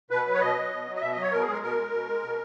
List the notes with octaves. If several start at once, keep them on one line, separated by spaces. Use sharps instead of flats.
B2 B4
F#3
C#5
B2 D#5
F#3
B2
F#3
D#5
B2 E5
F#3 D#5
C#5
B2 A#4
G#4
G#3 A#4
B2 A#4
G#3
B2
G#3
B2